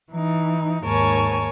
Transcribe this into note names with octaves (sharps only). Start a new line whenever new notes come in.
E3 D#4
D#2 G#2 A#4 C#5 G#5 A5